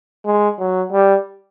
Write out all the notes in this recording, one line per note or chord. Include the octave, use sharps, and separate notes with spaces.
G#3
F#3
G3